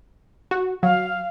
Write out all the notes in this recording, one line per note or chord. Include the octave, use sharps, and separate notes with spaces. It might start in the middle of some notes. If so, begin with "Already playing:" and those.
F#4
F#3 F5